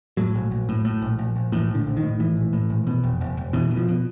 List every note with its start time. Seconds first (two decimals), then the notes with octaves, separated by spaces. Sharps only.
0.17 A2 F#3
0.35 A#1
0.51 A#1
0.69 A2
0.85 A2
1.02 A#1
1.19 A#1
1.36 A#1
1.52 A2 E3
1.68 A#1
1.75 D3
1.86 A#1
1.97 D#3
2.03 A2
2.19 A2 E3
2.37 A#1
2.53 A2
2.70 A#1
2.87 B2
3.03 F1
3.21 F1
3.37 F1
3.53 B2 E3
3.71 B2
3.77 F3
3.88 B2